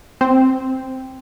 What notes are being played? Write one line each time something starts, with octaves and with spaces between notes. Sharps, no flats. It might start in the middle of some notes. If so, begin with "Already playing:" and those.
C4